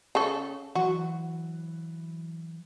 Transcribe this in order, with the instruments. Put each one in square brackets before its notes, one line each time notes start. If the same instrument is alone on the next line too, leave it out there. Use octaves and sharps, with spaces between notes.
[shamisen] C#3 A4
[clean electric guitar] E3 F#3 [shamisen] F#4